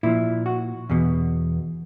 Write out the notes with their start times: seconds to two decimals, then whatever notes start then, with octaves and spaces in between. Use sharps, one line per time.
0.03 A#2 F3 E4
0.46 F#4
0.90 E2 B2